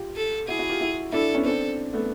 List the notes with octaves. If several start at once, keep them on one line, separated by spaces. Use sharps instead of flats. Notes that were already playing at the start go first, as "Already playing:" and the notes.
Already playing: F4 G4
A4
E4 F#4 G#4
E4 F#4
F4 G4
E4 F#4
D4 E4 A4
B3 C#4
C4 D4 A4
A3 B3